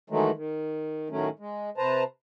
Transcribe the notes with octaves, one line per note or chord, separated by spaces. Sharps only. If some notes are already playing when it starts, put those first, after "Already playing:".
D#3 E3 F#3 G#3 A3
D#3
A2 D#3 F#3 A3 C#4
G#3
C3 B4 C5 A5 A#5